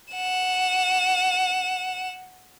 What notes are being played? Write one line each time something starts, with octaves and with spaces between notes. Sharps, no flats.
F#5 E7